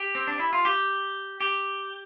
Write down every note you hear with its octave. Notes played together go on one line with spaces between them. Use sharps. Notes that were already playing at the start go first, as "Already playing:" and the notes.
Already playing: G4
C4
D4
E4
F4
G4
G4